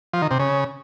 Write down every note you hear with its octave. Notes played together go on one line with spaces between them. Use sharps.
F3
D#3
C3
C#3